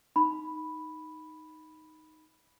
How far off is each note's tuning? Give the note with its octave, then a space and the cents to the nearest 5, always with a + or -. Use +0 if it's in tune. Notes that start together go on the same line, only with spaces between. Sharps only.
D#4 +0 B5 +0